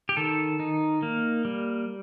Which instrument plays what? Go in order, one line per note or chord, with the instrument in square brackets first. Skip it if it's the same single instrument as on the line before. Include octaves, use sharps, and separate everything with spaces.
[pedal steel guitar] G4
D#3 A4
D#4
A#3
G3